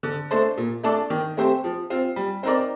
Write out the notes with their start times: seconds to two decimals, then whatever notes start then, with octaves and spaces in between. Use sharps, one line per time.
0.03 D3
0.31 A3 D4 A4 C5
0.57 A#2
0.83 A3 D4 A4 D5
1.10 D#3
1.37 A3 C4 G4 C5
1.64 F3
1.90 C4 F4
2.16 G3
2.43 C4 D#4 A#4 D5